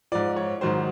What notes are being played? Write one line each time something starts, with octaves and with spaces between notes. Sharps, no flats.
G#2 F3 D5
C#5
G#2 D#3 F#3 C5